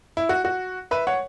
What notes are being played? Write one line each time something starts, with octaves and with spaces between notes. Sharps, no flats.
E4
F#4
F#4
B4 E5
C#5 F#5